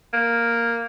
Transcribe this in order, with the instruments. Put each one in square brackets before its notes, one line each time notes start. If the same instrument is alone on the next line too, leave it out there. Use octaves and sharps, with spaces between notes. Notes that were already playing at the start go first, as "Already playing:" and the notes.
[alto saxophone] A#3